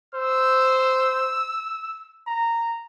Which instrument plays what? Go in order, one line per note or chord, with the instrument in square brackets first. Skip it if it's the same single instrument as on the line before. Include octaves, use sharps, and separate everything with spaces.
[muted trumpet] C5 [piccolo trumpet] E6
[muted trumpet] A#5